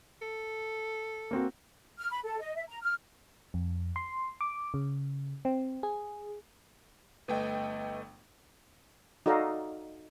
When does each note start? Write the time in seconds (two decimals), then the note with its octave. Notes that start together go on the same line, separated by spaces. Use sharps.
0.22 A4
1.31 A#3 C4 F#4
1.99 F6
2.11 B5
2.25 A4
2.39 D#5
2.55 E5
2.68 A#5
2.82 F6
3.54 F2
3.96 C6
4.41 D6
4.74 C#3
5.45 C4
5.83 G#4
7.28 G1 A3 B4 D#5 G5
9.26 D#4 F#4 A4 D5 D#5 F5